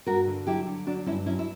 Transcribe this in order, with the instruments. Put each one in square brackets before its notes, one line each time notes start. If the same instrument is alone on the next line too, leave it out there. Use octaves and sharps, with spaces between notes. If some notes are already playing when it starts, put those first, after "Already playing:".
[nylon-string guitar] G2 F#4 A#4
D3
F#3 E4 G4
D3
F#3 D4 F#4
G2 C#4 E4
F#3 C#4 E4
E4